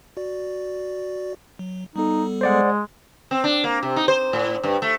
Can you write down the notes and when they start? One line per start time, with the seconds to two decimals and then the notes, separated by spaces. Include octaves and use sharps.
0.17 F#4 D5
1.59 F#3
1.96 G3 B3 D#4 A4
2.41 G#3 C5 D5 F#5
3.31 C4
3.44 D4
3.64 A#3
3.83 C3
3.96 D#4
4.08 C5
4.33 A2
4.64 G2
4.82 A3